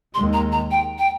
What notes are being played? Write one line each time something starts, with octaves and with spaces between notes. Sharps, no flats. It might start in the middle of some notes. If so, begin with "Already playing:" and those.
D#2 D#3 G#3 C6
A#5
A#5
G5
G5